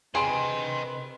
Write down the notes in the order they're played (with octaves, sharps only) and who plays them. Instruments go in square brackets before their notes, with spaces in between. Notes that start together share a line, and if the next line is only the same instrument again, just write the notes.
[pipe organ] C3 B4 [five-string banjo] G#4 B5 [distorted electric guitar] D#5 G5 [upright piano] C6 D7